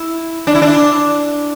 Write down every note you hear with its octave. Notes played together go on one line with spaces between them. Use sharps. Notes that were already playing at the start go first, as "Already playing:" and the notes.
Already playing: E4
D4
E4
D4